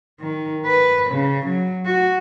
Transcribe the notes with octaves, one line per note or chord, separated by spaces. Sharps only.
D#3
B4
C#3
F#3
F#4